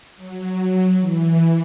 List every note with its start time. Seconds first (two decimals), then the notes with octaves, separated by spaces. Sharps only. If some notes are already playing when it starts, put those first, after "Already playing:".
0.17 F#3
1.00 E3